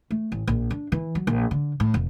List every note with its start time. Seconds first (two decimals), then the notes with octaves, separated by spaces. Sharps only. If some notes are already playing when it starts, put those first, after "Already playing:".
0.11 A3
0.32 A1
0.47 A#1
0.70 D4
0.92 E3
1.15 F#3
1.27 A#1
1.51 D3
1.80 A2
1.94 F1